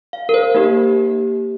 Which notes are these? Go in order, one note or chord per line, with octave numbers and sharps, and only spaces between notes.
F5
A#4
C5
A#3 D#4 G4